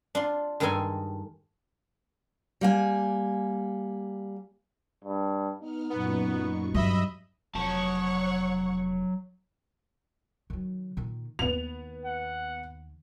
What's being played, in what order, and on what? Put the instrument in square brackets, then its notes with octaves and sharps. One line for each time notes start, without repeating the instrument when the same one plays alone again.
[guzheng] D4 F4 C6
G2 D#3 G#3 D#4 A4 G#5
[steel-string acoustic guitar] G3 A#3 G#5
[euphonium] G2
[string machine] B3 F6 [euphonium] D#4
[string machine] F#2 A#2 C#6 [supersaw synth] B3
[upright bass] G2 F#3 [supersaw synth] D#5 E5 B5
[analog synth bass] F1 [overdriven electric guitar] F#3 A5 [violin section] C#5 F#5 C#6
[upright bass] D#3 F#3
A#2 D#3
[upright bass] D#2 D#3 [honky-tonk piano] B3 F7
[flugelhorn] F#5